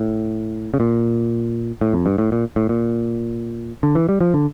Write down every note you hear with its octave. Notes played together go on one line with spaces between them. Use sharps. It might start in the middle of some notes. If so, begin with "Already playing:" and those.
Already playing: A2
C#3
A#2
A2
F2
G2
A2
A#2
A2
A#2
D3
E3
G3
F3
D3